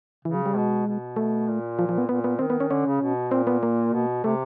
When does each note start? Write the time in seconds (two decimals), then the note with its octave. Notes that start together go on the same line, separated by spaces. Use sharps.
0.25 C#3 E3
0.34 F#3
0.46 G3
0.55 B2 G#3
0.86 B2
1.16 A3
1.47 A#2
1.79 F3
1.89 F3
1.98 B3
2.09 A#2 B3
2.24 B3
2.39 D#3 C4
2.50 B3
2.60 C#4
2.70 D3 C#4
2.86 C#3
3.01 B2
3.31 A#2 C4
3.47 B3
3.63 A#3
3.93 B2
4.23 C3 A3